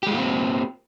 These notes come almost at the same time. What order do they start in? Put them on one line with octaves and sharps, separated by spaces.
G4 G#3 F4 A#3 C4